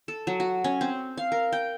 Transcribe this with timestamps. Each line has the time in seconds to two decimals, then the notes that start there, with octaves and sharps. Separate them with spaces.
0.08 A4
0.27 F#3
0.40 F#4
0.64 C#4
0.81 C4
1.17 F5
1.32 A#4
1.53 G5